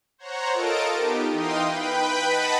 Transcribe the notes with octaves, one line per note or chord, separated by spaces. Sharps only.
C5 C#5 F#5 A#5
F4 A4 A#4 D#5 A5 D7
B3 D#4 G4
E3 D#4 F5 G5 C6 D#6
B4 G5 B5
B4 D#5 F#5 A5 B5